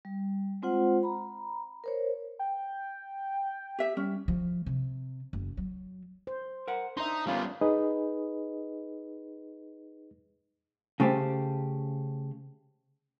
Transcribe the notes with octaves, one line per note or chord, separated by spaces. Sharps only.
G3
G#3 C4 F4 C5 F#5
A#5 B5
A#4 C5 C#5
G5
G4 E5
G3 C#4
F3
C3
F#1
F#3
C5
A#4 F#5
D4 D#4 E5 C6
G3 A#3 B3 C#4 F4
D#4 G#4 B4 D#5
C#3 A3 G4 C5